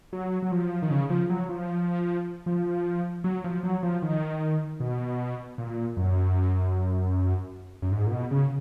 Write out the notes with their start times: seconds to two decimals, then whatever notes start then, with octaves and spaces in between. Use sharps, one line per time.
0.13 F#3
0.42 F#3
0.52 F3
0.82 D#3
0.90 C#3
1.10 F3
1.30 F#3
1.49 F3
2.46 F3
3.24 F#3
3.44 F3
3.63 F#3
3.83 F3
4.02 D#3
4.80 B2
5.58 A#2
5.97 F#2
7.82 F#2
7.92 G#2
8.07 A#2
8.11 B2
8.31 C#3